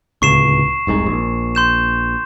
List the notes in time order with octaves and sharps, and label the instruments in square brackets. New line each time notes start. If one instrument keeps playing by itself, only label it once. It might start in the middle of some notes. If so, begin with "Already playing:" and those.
[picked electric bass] D1 C#2 [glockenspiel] C#6 C7 E7
[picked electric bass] F1 C2 G#2
A#1
[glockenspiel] C6 G6 E7